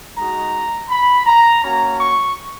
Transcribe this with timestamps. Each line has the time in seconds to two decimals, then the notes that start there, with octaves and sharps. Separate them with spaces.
0.16 G#3 D#4 F#4 A#5
0.90 B5
1.26 A#5
1.63 A#3 C#4 F#4 A#5
1.99 C#6